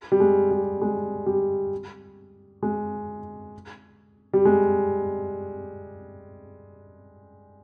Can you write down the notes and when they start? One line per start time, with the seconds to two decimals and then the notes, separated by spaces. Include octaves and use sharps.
0.12 G3
0.20 G#3
0.51 G3
0.81 G#3
1.26 G3
2.63 G#3
4.33 G3
4.45 G#3